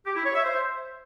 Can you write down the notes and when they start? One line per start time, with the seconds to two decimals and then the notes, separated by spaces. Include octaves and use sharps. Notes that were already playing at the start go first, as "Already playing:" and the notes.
0.06 G4
0.15 E4
0.25 C#5
0.35 E5
0.44 C5